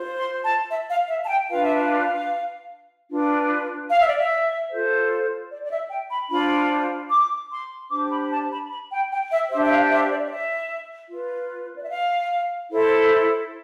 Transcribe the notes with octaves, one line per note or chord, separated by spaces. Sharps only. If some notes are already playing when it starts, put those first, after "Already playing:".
Already playing: F4 C5
C6
A5
E5
F5
E5
A5
G5
D4 F4 B4 F5
E5
F5
D4 F4 B4
F5
E5
D5
E5
F4 A4 C5
D5
D5
E5
G5
B5
D4 F4 C5 B5
D6
C6
D4 G4 C5 D6
B5
A5
B5
B5
G5
G5
E5
D4 G4 C5 E5
E5
F5
E5
D5
D5
E5
F4 B4
D5
E5
F5
E4 A4 C5